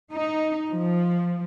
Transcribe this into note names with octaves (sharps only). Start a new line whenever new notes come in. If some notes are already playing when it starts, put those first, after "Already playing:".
D#4
F3